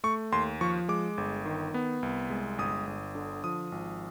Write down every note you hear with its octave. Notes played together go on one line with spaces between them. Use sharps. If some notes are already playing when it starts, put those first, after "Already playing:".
A3 C#6
D#2 C6
F3 C#6
G#3 D6
G1
D#3
B3
C2
G#3
G1 D#6
G1
D3
F3 D#6
G#1